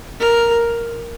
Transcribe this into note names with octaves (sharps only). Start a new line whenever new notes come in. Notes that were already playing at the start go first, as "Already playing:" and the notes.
A#4